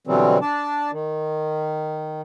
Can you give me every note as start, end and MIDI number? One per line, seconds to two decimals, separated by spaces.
0.07 0.38 47
0.07 0.38 50
0.07 0.38 52
0.07 0.38 54
0.07 0.38 55
0.07 0.38 60
0.41 0.91 62
0.41 0.91 74
0.41 0.91 81
0.92 2.22 51